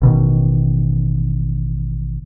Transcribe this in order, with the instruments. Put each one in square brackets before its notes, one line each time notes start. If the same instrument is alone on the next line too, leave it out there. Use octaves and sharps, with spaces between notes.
[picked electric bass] A1 B2 D#3